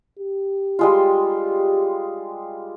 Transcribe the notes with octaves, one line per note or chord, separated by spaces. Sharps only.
G4
G3 G#3 F4